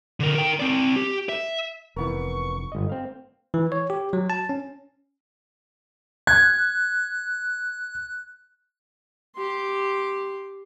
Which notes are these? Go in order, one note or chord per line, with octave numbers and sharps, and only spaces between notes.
D3 A#4
A#4 G5
C4 D5
G4
E5
F1 E3 B3 A#4 C#6
G1 D#5
C4 F5
E3
C#5
G4
F#3
A5
C#4
F#6 G#6
G4 C6